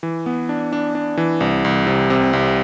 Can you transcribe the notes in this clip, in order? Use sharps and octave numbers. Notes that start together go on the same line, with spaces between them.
E3
B3
D4
D4
D4
E3
C2
C2
C3
C3
C2